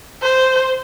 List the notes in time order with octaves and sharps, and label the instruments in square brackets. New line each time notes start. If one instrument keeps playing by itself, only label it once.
[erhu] C5